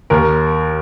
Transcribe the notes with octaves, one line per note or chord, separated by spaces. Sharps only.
D#2 A#4